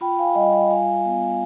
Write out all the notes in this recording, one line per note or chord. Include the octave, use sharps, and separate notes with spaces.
F4 G5 B5
F5 G#5
G3 D#5 G5
D#5 G5
F4 F5 G#5
B3